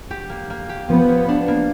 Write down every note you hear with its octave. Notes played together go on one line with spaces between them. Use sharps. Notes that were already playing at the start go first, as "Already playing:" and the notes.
G4
A#3
A#3
G4
F3 B3
A#3
D4
A#3